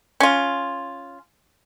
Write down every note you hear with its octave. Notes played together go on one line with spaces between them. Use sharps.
C#4 F4